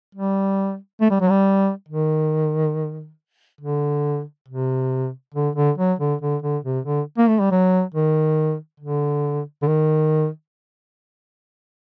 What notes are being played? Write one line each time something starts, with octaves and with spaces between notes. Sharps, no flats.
G3
A3
G3
F#3
G3
D#3
D3
C3
D3
D3
F#3
D3
D3
D3
C3
D3
A#3
A3
G3
F#3
D#3
D3
D3
D#3